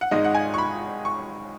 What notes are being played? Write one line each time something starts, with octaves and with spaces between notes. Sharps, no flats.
F#5
G#1 G#2 G#3 D#4 D#5
F#5
G#5
C#6
B5
C#6